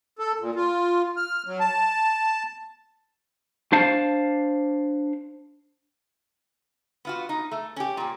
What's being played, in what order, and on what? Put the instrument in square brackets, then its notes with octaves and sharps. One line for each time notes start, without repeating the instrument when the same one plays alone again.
[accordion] A4
A#2
F4
F6
F#3
A5
[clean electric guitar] D4 C5 F5 A5
[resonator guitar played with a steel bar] B3 F4 F#4
D#4
A3
C#4 G4
A#2 G3